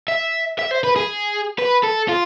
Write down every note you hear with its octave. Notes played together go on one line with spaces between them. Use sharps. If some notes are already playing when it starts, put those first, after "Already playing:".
E5
E5
C5
B4
G#4
B4
A4
F4